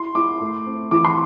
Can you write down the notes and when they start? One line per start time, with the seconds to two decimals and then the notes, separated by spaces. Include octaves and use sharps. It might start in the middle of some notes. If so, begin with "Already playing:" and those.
Already playing: E4 C6
0.15 E4 D6
0.41 A3
0.66 C4
0.91 E3 D6
1.05 C6